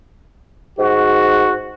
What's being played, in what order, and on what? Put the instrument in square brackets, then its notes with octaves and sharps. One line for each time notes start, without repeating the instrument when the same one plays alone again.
[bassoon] G#2 [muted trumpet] F#4